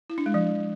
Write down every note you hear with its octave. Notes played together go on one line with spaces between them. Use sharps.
E4
D4
G#3
F3